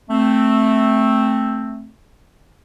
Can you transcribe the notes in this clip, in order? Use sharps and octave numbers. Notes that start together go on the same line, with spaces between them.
A3 C4